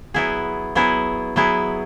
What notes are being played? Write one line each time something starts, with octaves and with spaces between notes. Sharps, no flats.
F#3 B3 E4 G#4
F#3 B3 E4 G#4
F#3 B3 E4 G#4